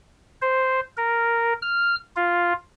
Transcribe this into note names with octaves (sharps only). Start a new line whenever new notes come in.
C5
A#4
F6
F4